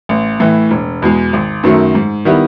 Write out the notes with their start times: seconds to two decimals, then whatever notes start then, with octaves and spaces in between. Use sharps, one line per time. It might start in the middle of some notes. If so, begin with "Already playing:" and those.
0.09 A1
0.40 A2 E3
0.71 E1
1.02 E2 B2 G#3
1.33 G#1
1.63 F#2 D#3 F#3 A3
1.95 G#2
2.25 D#3 G3 B3 E4